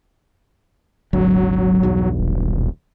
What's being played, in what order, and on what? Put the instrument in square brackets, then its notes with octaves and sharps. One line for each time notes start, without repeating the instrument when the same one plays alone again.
[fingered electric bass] D#1 G#1 D3 [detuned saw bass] F#3
[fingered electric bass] B1 E2 G2
[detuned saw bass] D#1